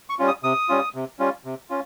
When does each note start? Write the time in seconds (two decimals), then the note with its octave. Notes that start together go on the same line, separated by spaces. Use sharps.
0.10 C#6
0.19 G3 C#4 F4
0.28 D#6
0.43 C3 D#6
0.69 G3 C#4 F4
0.95 C3
1.19 G3 C#4 F4
1.45 C3
1.70 C#4 F4